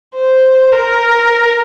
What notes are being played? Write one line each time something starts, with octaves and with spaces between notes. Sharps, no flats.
C5
A#4